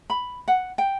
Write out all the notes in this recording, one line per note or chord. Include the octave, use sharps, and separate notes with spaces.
B5
F#5
G5